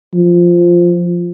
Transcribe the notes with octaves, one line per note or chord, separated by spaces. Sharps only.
F3